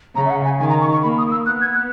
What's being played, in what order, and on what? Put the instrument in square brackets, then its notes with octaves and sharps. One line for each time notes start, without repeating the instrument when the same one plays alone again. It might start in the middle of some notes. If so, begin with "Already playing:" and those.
[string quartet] C#3 [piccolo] A#5
[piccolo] E5
F#5
G#5
[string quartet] D#3 [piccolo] G#5
[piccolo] A#5
C#6
C#6
[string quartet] A#3 [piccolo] B5
[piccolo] D#6
E6
[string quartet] B3 [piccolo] F#6
[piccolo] G#6
F#6